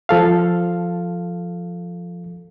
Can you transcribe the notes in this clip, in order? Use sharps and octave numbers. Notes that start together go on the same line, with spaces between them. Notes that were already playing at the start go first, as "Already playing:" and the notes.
F3 A4 F5